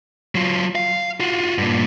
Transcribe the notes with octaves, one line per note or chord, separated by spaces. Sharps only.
F#3 F4
F5
F4 F#4
G2 A#2